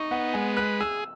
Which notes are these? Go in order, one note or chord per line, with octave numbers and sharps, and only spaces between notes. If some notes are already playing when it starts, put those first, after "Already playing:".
Already playing: D#4 C#6
B3 F#5
G#3 G#5
B4 F#6
G#4 E6